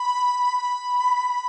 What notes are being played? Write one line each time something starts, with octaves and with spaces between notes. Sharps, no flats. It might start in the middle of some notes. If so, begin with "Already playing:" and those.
Already playing: B5
B5